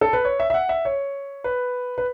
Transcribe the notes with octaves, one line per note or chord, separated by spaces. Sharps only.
A4
B4
C#5
E5
E5
F#5
E5
C#5
B4
B4